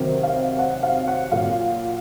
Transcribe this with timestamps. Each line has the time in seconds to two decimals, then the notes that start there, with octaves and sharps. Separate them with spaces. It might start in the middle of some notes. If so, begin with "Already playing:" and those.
Already playing: C3 D#3 F#3 A#4
0.23 F5
0.59 F#5
0.83 F5
1.08 F#5
1.31 A#2 F#3 F5